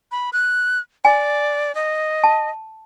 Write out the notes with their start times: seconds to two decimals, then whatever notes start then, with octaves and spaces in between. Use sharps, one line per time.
0.12 B5
0.33 F#6
1.05 D5 G#5
1.75 D#5
2.24 A5